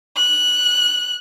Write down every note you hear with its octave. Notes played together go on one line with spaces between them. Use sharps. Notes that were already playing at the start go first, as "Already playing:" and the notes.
F#6